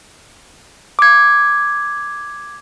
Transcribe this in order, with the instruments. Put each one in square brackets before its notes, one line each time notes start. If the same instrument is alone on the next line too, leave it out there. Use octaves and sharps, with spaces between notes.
[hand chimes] D6 G#6